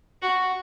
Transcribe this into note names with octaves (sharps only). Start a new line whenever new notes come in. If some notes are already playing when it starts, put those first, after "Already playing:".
F#4